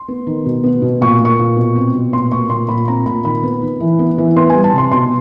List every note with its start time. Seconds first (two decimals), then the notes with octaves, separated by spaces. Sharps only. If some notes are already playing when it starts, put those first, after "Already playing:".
Already playing: C6
0.08 B3
0.27 D#3
0.46 B2
0.63 B3
0.82 B2
1.01 A#2 C#6
1.20 A#3
1.25 C#6
1.39 A#2
1.57 B2
1.76 C4
1.95 B2
2.12 A#2 C6
2.31 A#3 C#6
2.50 A#2 C6
2.69 A#2 B5
2.87 C4 A#5
3.06 A#2 B5
3.24 D#3 B5
3.43 B3
3.62 D#3
3.80 E3
3.99 B3
4.18 E3
4.36 B3 C6
4.50 G3 G#5
4.64 A5
4.73 C3
4.78 C6
4.91 B2 C6